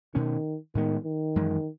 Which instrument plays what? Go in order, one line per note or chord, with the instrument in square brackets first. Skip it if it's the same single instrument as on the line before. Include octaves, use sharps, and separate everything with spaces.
[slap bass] B2 A3 C#4 [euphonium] D#3
[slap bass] A2 G#3 B3 [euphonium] D#3
[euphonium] D#3
[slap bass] F#2 E3 G#3